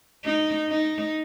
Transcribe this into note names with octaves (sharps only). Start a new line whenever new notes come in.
D#4
D#4